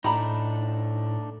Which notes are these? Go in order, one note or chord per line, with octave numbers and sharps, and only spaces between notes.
A2 A3 D4 D#4 A#5 B5